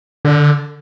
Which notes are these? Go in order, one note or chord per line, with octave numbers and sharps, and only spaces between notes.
D3